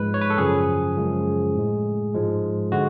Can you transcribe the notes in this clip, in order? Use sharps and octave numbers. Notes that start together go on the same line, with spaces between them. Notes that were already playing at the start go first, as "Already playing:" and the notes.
Already playing: G#2 F3 G#3 B4
C#5
B4
A4
F#2 C#3 F3 G#4
F#2 C#3 F3 G#3
A2 G#3
G#2 F3 G#3
D3 G#3 F#4